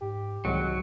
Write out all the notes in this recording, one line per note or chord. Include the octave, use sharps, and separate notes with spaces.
G#2 G4
C2 G#2 D#3 F#3 G#3